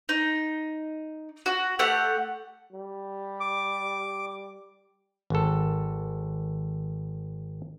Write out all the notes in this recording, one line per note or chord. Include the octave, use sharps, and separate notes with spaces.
D#4
F#4
A3 G4 F#5
G3
D6
G#1 A4